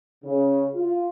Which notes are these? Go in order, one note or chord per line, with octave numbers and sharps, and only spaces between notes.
C#3
F4